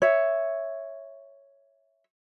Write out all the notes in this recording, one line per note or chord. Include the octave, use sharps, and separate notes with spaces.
C#5 E5